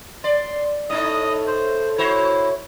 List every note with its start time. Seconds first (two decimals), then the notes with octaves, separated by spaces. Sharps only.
0.24 D5 C6
0.90 A2 D#4 D#5 D#6
1.47 C5
1.98 E4 F#4 C5 C#5